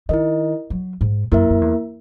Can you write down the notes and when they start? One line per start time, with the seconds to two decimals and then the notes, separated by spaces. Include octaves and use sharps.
0.09 D#3 E4 A#4 D#5
0.70 F#3
1.01 G#2
1.32 F#2 A#3 E4 A#4 E5
1.50 F#2
1.61 E2